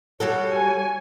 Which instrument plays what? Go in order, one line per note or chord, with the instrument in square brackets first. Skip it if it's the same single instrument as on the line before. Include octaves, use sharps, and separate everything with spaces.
[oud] G3 F#4 A4 [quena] C#5
[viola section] G#5